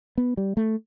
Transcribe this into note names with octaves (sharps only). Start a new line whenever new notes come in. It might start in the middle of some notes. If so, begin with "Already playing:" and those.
B3
G3
A3